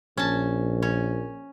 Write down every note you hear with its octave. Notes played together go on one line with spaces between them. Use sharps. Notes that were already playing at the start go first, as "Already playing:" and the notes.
A#1 C#4 A5
C#4